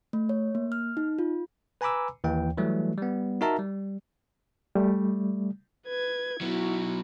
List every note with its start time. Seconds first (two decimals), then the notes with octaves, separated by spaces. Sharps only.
0.13 A3
0.29 C#5
0.55 A#3
0.72 F6
0.97 D#4
1.19 F4
1.81 B4 G#5 A#5 B5 D6 E6
2.24 D#2 E3 G5
2.58 E3 F#3 G3 A3
2.98 G3 B3
3.41 D#4 F#4 A#4 E5 A5 A#5
3.59 G3
4.75 G3 A3
5.87 B4 G#6
6.41 F#3 B3 E4 F#4